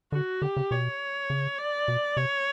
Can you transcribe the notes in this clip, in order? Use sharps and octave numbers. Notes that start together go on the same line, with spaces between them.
D3 F#4
D3 G4
C#3
B2 C#5
C#3
D5
B2
C3 C#5